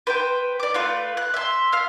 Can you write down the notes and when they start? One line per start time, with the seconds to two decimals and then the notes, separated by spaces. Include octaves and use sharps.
0.07 B4 C5 G5
0.60 D5 D6
0.74 A3 F4 B4
1.17 F#6
1.34 E5 C6
1.72 F5 F6